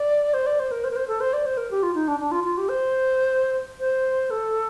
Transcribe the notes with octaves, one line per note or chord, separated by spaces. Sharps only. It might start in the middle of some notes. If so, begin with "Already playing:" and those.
Already playing: D5
C5
D5
C5
A#4
C5
A#4
C5
A4
C5
D5
C5
A#4
G4
F4
D#4
D4
D4
F4
F4
G4
C5
C5
A4